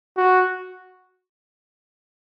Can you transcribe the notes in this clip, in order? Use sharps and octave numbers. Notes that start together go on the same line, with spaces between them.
F#4